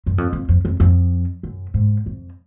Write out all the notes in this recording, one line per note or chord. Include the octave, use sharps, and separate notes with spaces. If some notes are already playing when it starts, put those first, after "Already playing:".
F#2
F2
F2
F2
F2
F2
F#2
G#2
F2